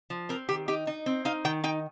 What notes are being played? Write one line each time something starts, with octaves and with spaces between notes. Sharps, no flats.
F3
C4 A#4
D#3 G4
D#4 G4
D#4
C4
D#4 F5
D#3 G5
D#4 G5